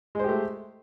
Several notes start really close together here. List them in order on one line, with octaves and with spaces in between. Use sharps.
G#3 C5 G4 A3